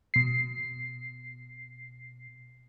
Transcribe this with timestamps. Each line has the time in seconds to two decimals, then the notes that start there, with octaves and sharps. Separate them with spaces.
0.14 B2 C7